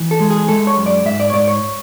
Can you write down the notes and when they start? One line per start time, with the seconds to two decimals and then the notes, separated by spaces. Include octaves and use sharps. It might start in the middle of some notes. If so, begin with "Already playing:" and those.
Already playing: E3
0.11 A4
0.20 G#3
0.30 G#4
0.49 G#3 A4
0.67 C#5
0.77 F#2
0.86 D5
1.06 G#2 E5
1.20 D5
1.30 C#5
1.34 G#2 D5
1.48 C#5